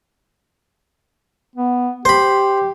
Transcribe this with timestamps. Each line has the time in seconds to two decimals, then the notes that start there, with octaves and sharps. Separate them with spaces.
1.56 B3
2.05 G4 C5 B5